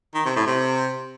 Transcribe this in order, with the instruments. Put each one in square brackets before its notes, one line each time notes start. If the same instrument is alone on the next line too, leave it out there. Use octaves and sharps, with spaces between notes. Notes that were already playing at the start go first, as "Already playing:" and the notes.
[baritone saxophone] D#3
C3
A2
C3